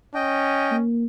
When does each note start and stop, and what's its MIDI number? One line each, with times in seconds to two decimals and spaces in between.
0.15 0.84 61
0.15 0.76 75
0.15 0.76 79
0.71 1.06 58